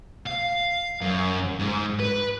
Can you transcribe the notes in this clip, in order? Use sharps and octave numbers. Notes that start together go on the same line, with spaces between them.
F5
F#2
G#2
B4